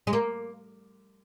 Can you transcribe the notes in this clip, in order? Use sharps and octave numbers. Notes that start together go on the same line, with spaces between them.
G#3
A#3